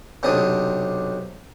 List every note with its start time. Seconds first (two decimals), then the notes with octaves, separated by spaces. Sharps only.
0.23 B1 C3 D4 D#6